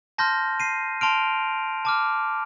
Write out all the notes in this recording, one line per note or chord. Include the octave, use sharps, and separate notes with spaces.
A5 C6 F6 G6 A#6
C7 D#7
A5 C6 F6 D7 F7
A5 D6 F6